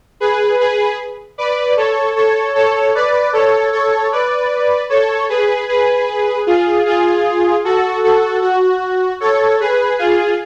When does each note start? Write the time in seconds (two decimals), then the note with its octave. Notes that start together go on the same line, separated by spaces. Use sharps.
0.20 G#4 B4
0.59 G#4 B4
1.38 B4 D5
1.77 A4 C#5
2.16 A4 C#5
2.55 A4 C#5
2.95 B4 D5
3.33 A4 C#5
3.73 A4 C#5
4.12 B4 D5
4.90 A4 C#5
5.29 G#4 B4
5.69 G#4 B4
6.46 F4 G#4
6.86 F4 G#4
7.65 F#4 A4
8.03 F#4 A4
8.42 F#4
9.20 A4 C#5
9.60 G#4 B4
9.98 F4 G#4